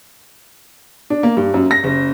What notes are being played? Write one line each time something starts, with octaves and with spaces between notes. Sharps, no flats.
D4
A#3
G2
F#2
A#6
F#1